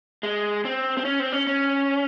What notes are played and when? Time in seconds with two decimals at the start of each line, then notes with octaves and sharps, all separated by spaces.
0.23 G#3
0.65 C4
0.97 C4
1.05 C#4
1.20 C4
1.32 C#4
1.47 C#4